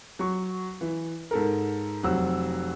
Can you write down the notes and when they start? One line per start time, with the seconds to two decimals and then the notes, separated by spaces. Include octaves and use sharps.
0.19 F#3 C#6
0.81 E3
1.31 G#2 A4 A#4
2.03 F1 F#3 C4 F#5 E6